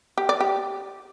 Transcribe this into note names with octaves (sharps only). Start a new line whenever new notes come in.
G4
D5
G4